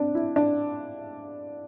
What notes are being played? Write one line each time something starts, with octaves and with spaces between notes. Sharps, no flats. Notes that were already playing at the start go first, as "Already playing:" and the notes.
Already playing: C4 D4
E4
D4